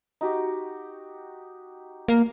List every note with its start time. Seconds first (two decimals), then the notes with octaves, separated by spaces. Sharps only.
0.21 D#4 F#4 G4
2.08 A#3